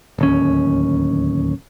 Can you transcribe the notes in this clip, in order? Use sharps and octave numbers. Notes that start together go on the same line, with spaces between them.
D1 D#2 C#4